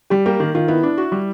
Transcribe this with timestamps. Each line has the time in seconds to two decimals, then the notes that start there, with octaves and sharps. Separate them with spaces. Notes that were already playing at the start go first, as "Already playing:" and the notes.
0.10 G3 G4
0.26 A#3 G4
0.40 D#3
0.55 D#3 F4
0.68 B3 E4
0.83 D4
0.98 F#4
1.12 G3